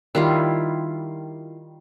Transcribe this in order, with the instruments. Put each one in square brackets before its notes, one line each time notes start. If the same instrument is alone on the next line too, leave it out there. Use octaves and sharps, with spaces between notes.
[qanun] D#3 G3 E4 F4